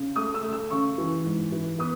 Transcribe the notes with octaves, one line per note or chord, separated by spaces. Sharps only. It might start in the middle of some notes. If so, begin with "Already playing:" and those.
Already playing: C#3
A3 D#6
E6
A3
E6
C#3 C#6
E3
G#2
E3
B3 D#6